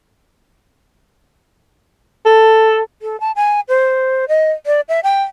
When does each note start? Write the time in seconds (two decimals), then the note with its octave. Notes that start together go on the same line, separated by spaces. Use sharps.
2.25 A4
3.02 A4
3.20 A5
3.36 G#5
3.68 C5
4.28 D#5
4.66 D5
4.89 E5
5.03 G5